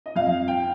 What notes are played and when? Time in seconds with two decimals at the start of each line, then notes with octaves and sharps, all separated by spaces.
0.06 D#5
0.16 F2 F5
0.48 G5